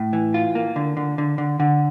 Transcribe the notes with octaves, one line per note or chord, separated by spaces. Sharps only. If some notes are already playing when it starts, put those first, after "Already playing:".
Already playing: A2
E3
F4
A#3
D3
D3
D3
D3
D3